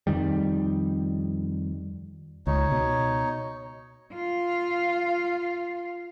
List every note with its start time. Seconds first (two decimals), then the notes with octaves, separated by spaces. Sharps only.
0.07 F2 D#3 G3
2.47 C#2 D#4 C#5
2.72 B2
4.14 F4 F5